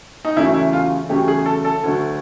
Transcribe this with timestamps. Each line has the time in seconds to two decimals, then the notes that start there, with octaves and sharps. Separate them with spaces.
0.25 D#4
0.37 E2 C#3 F#3 A3 E4
0.54 E4
0.73 F4
1.09 E2 C#3 F#3 A3 G4
1.28 G#4
1.46 A4
1.65 A4
1.84 D2 D3 F#3 A3